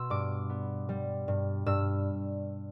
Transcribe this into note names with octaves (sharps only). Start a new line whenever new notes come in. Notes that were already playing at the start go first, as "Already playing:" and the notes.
Already playing: B2 C6 E6
G2 D6
B3
G3
G2
G2 E6